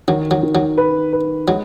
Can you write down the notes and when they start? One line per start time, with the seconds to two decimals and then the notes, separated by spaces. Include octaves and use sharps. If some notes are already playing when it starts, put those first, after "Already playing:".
0.08 D#3 F#3
0.31 F#3
0.43 D#3
0.55 F#3
0.78 B4
1.13 B4
1.48 F#3 G#3